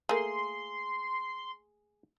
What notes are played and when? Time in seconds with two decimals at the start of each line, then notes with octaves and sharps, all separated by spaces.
0.09 A3 A#3 G#4 C6